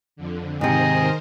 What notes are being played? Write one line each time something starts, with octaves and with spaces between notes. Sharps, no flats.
F2 D3
G#2 C3 D#3 G#4 A#4 C5 D#5